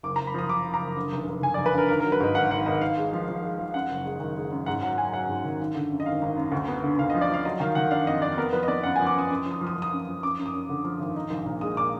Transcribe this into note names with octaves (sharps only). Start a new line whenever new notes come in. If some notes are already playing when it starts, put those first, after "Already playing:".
F#1 D6
A#5
F#1
B5
F3 D#6
F#1 D6
F#1
A#5
F#1
D3
F1
F1
F1 G#5
D5
F1
B4
D3 A#4
G#1 A#4
A#4
F#3
B4
G#2 D#5
G#1 F#5
G#1 F#5
G#1 D#5
G#1 F5
G#3
F3
F3
G#3
F3
F#2 F#5
F#1
G#3
D#3
G#3
F#2
G#2 F#5
F#3 F#5
F#3 G#5
F#3 F#5
G#2
D#3
G#1
D3
F#2
D#5
G#1 F5
G#1
F#2
D2
B3
D3
D2 F5
D#5
F3
D5
F3 F5
F#3 D#5
D#3 F5
D#3 F#5
D4 F5
F2 D#5
F2 D5
B3 A#4
F3 B4
D#5
B3 D5
F#2 F#5
G#5
F3
D6
F#2 D#6
F#2 D#6
F3
D#6
F3
D#6
F3
D#6
F#2
F3
F#2 D6
F#2
D#6
F#2
D3
F3
G#1
D#4
A#1
A#2
G#3 D#6
A#2 D6